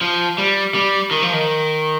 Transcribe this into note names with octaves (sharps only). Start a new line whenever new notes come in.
F3
G3
G3
D#3
F3
D#3